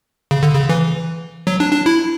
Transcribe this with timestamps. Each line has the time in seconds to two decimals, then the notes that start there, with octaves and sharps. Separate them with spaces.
0.31 C#3
0.43 D3
0.54 C#3
0.69 E3
1.47 F#3
1.60 D4
1.73 D4
1.86 E4